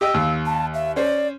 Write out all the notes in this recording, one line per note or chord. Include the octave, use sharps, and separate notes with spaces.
G4 D#5 G5 E6
D#2 F5
A5
E5
C#4 C5 D5